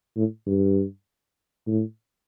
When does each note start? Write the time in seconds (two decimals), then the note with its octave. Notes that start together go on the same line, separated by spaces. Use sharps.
0.16 A2
0.46 G2
1.67 A2